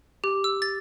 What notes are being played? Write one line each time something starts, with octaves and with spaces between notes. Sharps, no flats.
G4
E6
A6